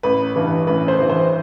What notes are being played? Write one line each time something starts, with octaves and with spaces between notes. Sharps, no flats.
A1 B4
G2 E3
A1 B4
C5
G2 E3
C5